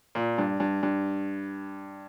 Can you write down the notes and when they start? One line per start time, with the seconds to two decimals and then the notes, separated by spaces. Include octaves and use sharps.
0.15 A#2
0.38 G2
0.60 G2
0.83 G2